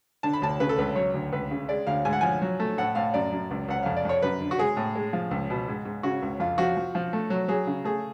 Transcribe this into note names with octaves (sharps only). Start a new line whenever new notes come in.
D3 A5
B5
D2 A5
C#3 B4
A4
C#2 B4
F#3 C#5
D2
C#2 B4
C#3
G#3 D5
D2 F5
G#2 G#5
F#5
F3 G#5
F#3
A3
A2 F#5
A2 F5
F#2 D5
F#2
C#2
C#2 F#5
F2 F5
D5
F2 C#5
F#2 B4
D3
F#4
G#3 G#4
A2
G#3
F3
C#2
B2
G#2
G#2
C#3 F#4
C#2
F2 F4
F3 F#4
F3
F3
A3
F#3
F#3 G#4
C#3
A3 G#4